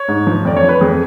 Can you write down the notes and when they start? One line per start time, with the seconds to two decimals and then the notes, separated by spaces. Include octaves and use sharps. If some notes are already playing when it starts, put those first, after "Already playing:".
Already playing: C#5
0.08 G#2
0.27 F3
0.45 F2 D5
0.56 C#5
0.63 F3
0.69 B4
0.81 F2 G#4